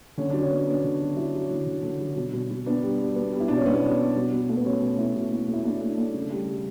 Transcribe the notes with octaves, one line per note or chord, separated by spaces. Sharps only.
D3 C#4
F#3 D4
C#4
B3
B3 D4
D3
F#3
F#3 E4
F#3
D3
D3
D3
F#3
B2
B2
B2
B3 D4
G3
G3
B3
G3
E4
B2 D4
C#4
B2 B3
B2
B3
B2
B2
A3
B3
B2 C#4
B2
A3 E4
B2
A3
A3
E4
A3 D4
A3
A3
C#3
G3
G3